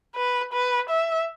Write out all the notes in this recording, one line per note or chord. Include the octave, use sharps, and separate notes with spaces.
B4
B4
E5